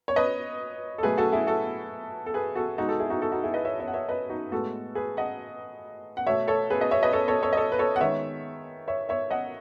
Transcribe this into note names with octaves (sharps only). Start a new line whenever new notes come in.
C#5
B4 D#5
A4
B2 F#3 A3 G#4 B4
F#4 A4
E4 G#4
F#4 A4
A4
G#4 B4
F#4 A4
B2 G#3 B3 D#4 F#4
F#4 A4
E4 G#4
D#4 F#4
F#4 A4
D#4 F#4
E4 G#4
B4 D#5
C#5 E5
C#5 E5
F#5
C#5 E5
B4 D#5
D#4 F#4
A2 G#3 B3 F#4 A4
G#4 B4
D#5 F#5
F#5
B2 A3 C#5 E5
A4 C#5
G#4 B4
B4 D#5
C#5 E5
B4 D#5
A4 C#5
A4 C#5
A4 C#5
D#5
A4 C#5
B4
A4 C#5
F#5
D#3 G#3 B3 C#5 E5
C#5 E5
C#5 E5
D#5 F#5